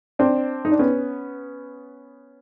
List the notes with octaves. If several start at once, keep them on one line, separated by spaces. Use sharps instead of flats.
C4 D4
D#4
D4
B3 C#4